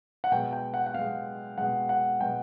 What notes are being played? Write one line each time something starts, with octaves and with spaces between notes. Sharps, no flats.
F#5
B2 G#3 G5
G5
F#5
F#5
B2 G#3 F5
B2 G#3 F#5
F#5
B2 G#3 G5